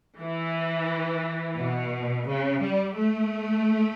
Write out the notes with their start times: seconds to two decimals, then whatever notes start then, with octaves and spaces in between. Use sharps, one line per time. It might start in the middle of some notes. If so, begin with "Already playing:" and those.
0.20 E3
1.58 B2
2.27 C#3
2.61 G3
2.96 A3